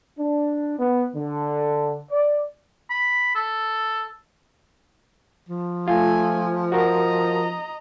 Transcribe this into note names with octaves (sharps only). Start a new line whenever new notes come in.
D4
B3
D3
D5
B5
A4
F3
A3 F4 G#5
F#4 A#4 D#5 A#5